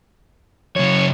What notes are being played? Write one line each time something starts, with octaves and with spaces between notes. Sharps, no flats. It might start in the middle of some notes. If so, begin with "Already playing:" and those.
F#2 C#3 C#5